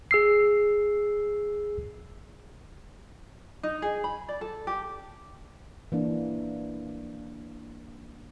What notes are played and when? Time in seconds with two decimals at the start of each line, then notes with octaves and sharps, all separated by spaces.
0.11 G#4 E6 C7
3.63 D#4
3.82 G#4
4.04 B5
4.28 D5
4.41 A4
4.67 G4
5.92 E3 A#3 D4